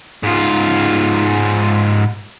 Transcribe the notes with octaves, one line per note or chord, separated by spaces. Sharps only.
G#2 F4